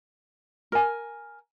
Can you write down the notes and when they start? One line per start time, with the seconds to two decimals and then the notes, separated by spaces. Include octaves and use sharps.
0.72 A#4 G#5